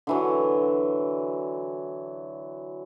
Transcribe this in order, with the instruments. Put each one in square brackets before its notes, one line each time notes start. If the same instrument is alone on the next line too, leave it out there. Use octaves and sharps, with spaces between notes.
[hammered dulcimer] D3 E3 F#3